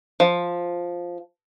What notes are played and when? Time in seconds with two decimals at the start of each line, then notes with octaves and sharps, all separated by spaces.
0.20 F3